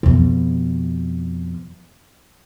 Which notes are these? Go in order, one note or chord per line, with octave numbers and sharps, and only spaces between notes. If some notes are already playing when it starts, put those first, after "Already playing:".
F2 B2